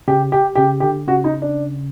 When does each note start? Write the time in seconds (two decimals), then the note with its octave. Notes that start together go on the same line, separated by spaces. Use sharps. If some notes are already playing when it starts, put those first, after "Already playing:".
0.08 C#3 G4
0.32 G4
0.55 C#3 G4
0.80 D3 G4
1.07 C#3 F#4
1.24 D#4
1.42 D4